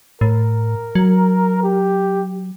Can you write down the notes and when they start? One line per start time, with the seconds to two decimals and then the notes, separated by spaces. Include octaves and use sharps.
0.21 A2 A#4
0.95 F#3
1.63 G4